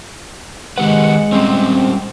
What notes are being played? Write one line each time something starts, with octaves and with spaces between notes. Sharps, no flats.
D#3 G#3 G4 B4 F#5
G3 C4 C#4